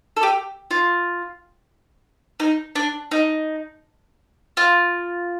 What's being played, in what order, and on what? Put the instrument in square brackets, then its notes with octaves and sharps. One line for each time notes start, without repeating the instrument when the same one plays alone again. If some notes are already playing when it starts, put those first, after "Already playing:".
[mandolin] A4
G4
F4
D#4
D4
D#4
F4